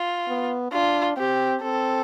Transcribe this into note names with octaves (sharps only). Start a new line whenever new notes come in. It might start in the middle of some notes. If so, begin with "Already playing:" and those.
Already playing: F4
B3
D4 F4
C4 G4
C4 A4